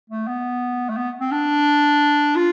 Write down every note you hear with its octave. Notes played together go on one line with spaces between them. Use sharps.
A3
B3
A3
B3
C4
D4
F4